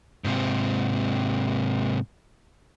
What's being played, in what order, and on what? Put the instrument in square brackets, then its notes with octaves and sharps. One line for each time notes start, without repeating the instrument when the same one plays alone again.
[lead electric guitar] G#2 C3